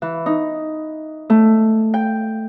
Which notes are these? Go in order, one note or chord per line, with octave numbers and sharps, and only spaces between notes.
E3
D#4
A3
G5